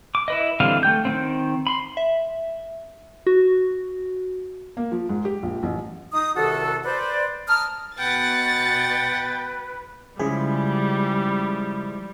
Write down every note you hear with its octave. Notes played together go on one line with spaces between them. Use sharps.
D6
E4 B4 D#5
D3 E3 G3 C4 F5
A3 G5 G6
D#3 B3 C4
B5 C6
E5
F#4
A#3
F3
G#2
G4
A#1
A1
D#4 D#6
C2 C3 D#3 F#4 A4
B4 C5 D5
A5 A#5 D#6 F6
B2 B4 F#5 G5 A6
C#3 F3 G3 G#3 E4 G#4